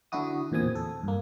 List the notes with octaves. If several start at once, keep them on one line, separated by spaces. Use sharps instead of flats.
D3 D4 E4 F#4 D#6
E2 A#2 C4 G#5 D#6
A4
G2 A#3